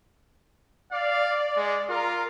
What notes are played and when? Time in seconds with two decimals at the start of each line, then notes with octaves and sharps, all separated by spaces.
0.92 D5 F5
1.57 G#3
1.90 F4 A#4